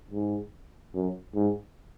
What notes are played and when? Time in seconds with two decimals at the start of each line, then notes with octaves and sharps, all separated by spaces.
0.11 G#2
0.95 F#2
1.35 G#2